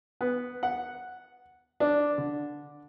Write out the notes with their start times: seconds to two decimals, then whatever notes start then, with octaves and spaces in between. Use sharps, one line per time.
0.21 B3
0.63 F#5
1.80 D4
2.18 D3